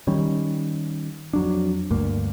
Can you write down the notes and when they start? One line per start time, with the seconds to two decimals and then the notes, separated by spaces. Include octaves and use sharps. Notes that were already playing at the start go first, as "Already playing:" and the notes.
0.07 D#3 G3 C#4
1.33 F2 F#3 D4
1.91 D2 G2 A#3